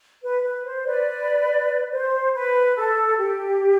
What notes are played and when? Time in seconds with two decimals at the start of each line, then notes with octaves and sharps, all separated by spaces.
0.23 B4
0.44 B4
0.65 C5
0.86 B4 D5
1.91 C5
2.34 B4
2.76 A4
3.19 G4